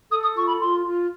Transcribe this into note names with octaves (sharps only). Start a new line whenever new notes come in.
A4 D#6
D#6
F4 C#6
B5
F4 C6
F4